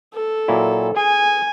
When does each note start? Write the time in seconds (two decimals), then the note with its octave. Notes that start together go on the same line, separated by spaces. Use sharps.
0.13 A4
0.48 A#2 F#3 E4
0.96 G#4 G#5